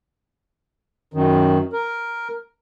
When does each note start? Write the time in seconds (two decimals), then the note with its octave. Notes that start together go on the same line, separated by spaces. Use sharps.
1.14 F#2 D#3
1.73 A#4